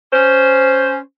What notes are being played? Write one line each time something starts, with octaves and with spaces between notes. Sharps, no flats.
C#4 C5